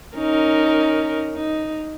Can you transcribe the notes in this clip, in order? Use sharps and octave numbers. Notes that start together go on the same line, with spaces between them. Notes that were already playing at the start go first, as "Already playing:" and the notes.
C#4 D#4 A#4
D#4